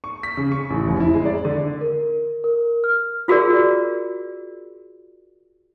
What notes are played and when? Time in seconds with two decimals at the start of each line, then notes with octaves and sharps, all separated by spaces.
0.04 C#6
0.23 B6
0.37 C#3
0.52 C#6
0.70 A1
0.87 F1
1.00 E4
1.14 G#3
1.26 D5
1.45 D3
1.81 A#4
2.44 A#4
2.84 F6
3.28 F4 F#4 G#4 A#4 D5